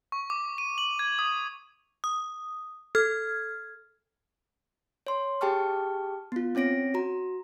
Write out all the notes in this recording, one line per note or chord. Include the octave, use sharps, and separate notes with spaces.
C#6
D6
D#7
F#7
G#6
D#6
D#6
A4 F6 G#6
C#5 C6
G4 G#4 G5 A5 C#6 F6
B3 F4
C4 C#4 C#5 A#6 D7
F#4 A#5